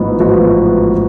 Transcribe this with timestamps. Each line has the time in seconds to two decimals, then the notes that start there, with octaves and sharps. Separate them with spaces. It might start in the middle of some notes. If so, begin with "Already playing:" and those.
Already playing: A1 G#2 F3 B3
0.19 A1 G#2 F3 B3 F#4